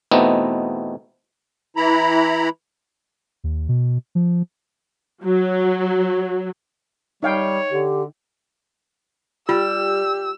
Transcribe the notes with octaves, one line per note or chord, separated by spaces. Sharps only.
E2 B2 A3 B3 C4 D#4
E3 E4 A#5 B5
D#2
B2
F3
F#3
G3 D#4 C#5 F5 G5
D3 G4
G3 F4 G4 E6